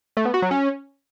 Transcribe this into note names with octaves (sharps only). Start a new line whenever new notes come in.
A3
B3
F#4
F#3
C#4